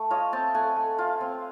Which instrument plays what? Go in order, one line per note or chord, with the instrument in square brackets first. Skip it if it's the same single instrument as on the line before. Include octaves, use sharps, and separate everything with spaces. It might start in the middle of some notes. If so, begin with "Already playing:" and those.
Already playing: [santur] A3
F4 C#5 D#5
C4 G5 A5
A3 F#5 G#5
A3
F4
C4